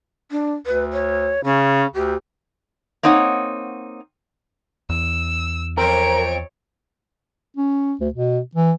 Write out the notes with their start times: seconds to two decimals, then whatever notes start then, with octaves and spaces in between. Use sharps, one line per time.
0.31 D4
0.66 D2 B4
0.93 C#5
1.44 C#3 C#4
1.94 D2 G4
3.03 A#3 C4 D#4 C#5 F#5
4.89 E2 E6
5.78 F2 G#2 C4 A#4 C#5 D7
7.57 C#4
8.01 D2
8.14 B2
8.55 E3